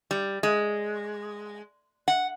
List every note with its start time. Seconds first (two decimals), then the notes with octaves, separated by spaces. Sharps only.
0.11 G3
0.43 G#3
2.08 F#5